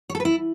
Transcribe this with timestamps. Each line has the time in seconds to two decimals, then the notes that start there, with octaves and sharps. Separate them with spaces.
0.10 C#5
0.15 A4
0.20 B4
0.25 E4